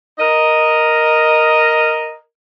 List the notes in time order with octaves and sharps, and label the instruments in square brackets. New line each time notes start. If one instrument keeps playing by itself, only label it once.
[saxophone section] A#4 D#5